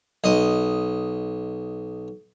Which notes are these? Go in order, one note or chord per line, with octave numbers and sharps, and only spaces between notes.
B1 D#5